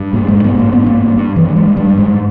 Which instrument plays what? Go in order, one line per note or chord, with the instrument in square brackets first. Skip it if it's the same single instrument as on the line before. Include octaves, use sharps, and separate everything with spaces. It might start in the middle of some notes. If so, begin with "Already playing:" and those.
Already playing: [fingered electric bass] G2
G#2 A#3
G#3
G#2
B3
G#2 A#3
G2 B3
A#3
G2
G2
G2 E3
G2 G#3
G2 G3
G#2 G#3